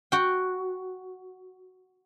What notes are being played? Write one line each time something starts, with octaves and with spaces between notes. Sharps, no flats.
F#4 G5